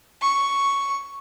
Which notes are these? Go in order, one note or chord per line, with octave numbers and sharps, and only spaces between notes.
C#6